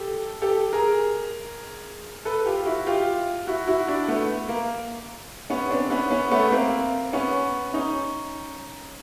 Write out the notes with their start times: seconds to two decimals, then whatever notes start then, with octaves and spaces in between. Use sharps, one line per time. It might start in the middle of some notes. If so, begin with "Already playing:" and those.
Already playing: G4 A4
0.42 G4 A4
0.73 G#4 A#4
2.25 A4 B4
2.46 F4 G4
2.65 E4 F#4
2.87 F4 G4
3.47 E4 F#4
3.67 E4 F#4
3.87 D4 E4
4.08 A3 B3
4.49 A#3
5.50 B3 C#4
5.70 C4 D4
5.90 B3 C#4
6.11 B3 C#4
6.31 A3 B3
6.52 A#3 C4
7.13 B3 C#4
7.74 C#4 D#4